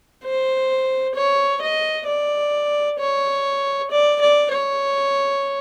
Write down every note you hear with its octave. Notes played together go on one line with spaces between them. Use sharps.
C5
C#5
D#5
D5
C#5
D5
D5
C#5